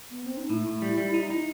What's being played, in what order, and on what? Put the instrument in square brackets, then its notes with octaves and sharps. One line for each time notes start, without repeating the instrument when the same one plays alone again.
[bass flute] B3
C4
D#4
[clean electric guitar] A2 [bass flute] E4
[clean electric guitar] A2
G3
G3
D#4
D#4